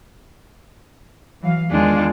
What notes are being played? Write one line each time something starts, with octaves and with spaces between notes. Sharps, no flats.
E3 F#3 F5
E2 D#3 G#3 D4 F4